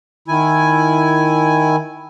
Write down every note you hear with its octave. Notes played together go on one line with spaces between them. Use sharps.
D#3 E4 G#5